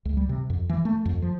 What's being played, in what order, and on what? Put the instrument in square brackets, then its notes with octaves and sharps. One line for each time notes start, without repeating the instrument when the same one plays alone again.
[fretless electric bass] C#2
G3
C3
F2
E3
A3
F2
F3